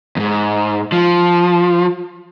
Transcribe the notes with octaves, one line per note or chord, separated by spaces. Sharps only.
E2 G#2
F3